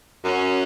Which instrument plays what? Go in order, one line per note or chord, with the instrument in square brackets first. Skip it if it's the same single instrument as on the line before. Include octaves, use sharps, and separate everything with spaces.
[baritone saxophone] F#2 [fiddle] C#4